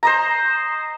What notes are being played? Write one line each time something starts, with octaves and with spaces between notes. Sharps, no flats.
C5 D#5 A#5